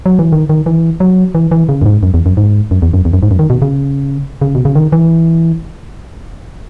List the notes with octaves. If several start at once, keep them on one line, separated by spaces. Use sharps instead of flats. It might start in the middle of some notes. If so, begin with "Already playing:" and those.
F#3
E3
D#3
D#3
E3
F#3
E3
E3
C#3
F#2
G#2
F#2
E2
F#2
G#2
F#2
E2
F#2
E2
F#2
G#2
F#2
D#3
B2
C#3
C#3
B2
C#3
D#3
E3